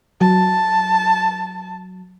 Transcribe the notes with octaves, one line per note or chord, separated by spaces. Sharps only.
F#3 A5